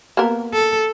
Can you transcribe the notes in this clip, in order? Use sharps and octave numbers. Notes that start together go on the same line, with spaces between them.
A#3 B3 A#4
A4